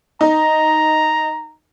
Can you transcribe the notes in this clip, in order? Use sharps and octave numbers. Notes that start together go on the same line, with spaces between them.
D#4 A#5